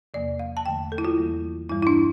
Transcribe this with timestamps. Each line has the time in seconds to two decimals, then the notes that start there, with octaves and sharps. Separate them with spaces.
0.14 E2 C3 F3 A#3 D5
0.39 F5
0.57 A5
0.66 E2 D3 F3 A3 G5
0.92 A4
0.98 E4
1.05 F4
1.18 E2 E3 G3 A#3
1.69 G2 E3 G3 E4
1.82 E4
1.87 D4